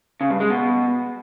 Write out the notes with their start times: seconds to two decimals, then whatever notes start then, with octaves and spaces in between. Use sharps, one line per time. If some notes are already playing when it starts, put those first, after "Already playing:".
0.21 C#3
0.30 G2
0.40 G#3
0.50 B2